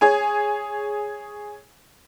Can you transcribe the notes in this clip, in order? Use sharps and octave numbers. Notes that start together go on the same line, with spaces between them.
G#4 C#5 G#5